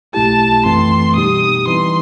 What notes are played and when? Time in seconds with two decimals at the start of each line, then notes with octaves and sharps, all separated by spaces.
0.14 B1 B2 A3 E4 G4 A5
0.65 F#2 E3 A3 C4 C6
1.16 B2 G3 B3 D#4 G4 D#6
1.67 E3 G3 C4 D#4 C6